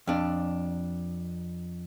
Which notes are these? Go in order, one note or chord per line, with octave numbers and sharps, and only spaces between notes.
F2 D4